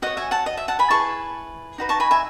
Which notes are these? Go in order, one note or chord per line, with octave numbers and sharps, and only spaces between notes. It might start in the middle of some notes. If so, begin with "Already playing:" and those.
F#4 C#5 D#5 F#5
E5 G#5
F#5 A5
D#5
E5
F#5 A5
G#5 B5
E4 G#4 B4 A5 C#6
D#4 F#4 B4
A5 C#6
G#5 B5
E5 G#5